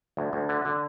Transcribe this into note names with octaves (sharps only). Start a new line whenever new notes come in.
D2
D2
D3
D3